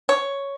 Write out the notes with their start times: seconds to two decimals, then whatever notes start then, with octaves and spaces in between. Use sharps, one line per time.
0.09 C#5